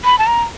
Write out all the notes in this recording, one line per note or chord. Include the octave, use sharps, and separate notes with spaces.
B5
A5
A#5